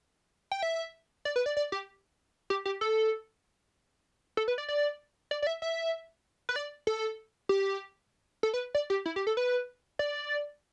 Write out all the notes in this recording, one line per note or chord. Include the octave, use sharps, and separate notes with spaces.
G5
E5
D5
B4
D5
D5
G4
G4
G4
A4
A4
B4
D5
D5
D5
D5
E5
E5
B4
D5
A4
G4
A4
B4
D5
G4
E4
G4
A4
B4
D5